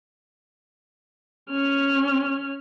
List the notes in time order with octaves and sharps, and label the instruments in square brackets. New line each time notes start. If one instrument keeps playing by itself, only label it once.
[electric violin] C#4 F6